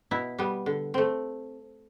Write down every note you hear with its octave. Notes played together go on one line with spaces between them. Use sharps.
B2 E4
G3 B3
D3
A3 C4